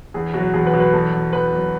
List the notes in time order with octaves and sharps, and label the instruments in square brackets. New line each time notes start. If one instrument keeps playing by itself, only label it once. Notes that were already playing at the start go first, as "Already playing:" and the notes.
[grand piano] E2 [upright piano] G#4
[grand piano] B2 F#3 [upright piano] F#4
[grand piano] E2 [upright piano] G#4
[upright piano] B4
[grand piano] B2 F#3
[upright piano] B4
[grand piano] E2 [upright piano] A4
[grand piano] B2 F#3
[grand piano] E2 [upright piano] B4
[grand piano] B2 F#3